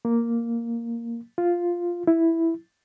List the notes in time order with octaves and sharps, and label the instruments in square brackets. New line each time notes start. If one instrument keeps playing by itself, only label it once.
[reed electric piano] A#3
F4
E4